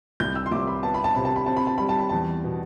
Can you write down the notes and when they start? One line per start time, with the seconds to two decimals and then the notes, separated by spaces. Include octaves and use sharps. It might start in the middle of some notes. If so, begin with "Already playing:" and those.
0.20 C2 G6
0.35 E6
0.46 C6
0.51 C2 D6
0.68 B5
0.83 B3 A5
0.94 B5
1.04 A5
1.15 C3 B5
1.25 A5
1.36 B5
1.46 C4 A5
1.56 B5
1.67 A5
1.78 G3 B5
1.89 A5
1.99 B5
2.09 E2 A5
2.44 B2